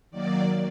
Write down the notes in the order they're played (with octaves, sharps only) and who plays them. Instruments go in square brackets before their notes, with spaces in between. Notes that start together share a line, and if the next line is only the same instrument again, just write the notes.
[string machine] D#3 F#3 A#3 D5